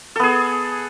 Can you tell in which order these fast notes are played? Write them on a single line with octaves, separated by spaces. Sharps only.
A4 B3 G#4